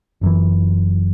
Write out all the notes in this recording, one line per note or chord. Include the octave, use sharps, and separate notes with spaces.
F#1 F#2 E3